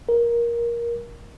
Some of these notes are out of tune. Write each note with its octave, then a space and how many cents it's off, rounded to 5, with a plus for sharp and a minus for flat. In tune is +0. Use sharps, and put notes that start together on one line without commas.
A#4 +15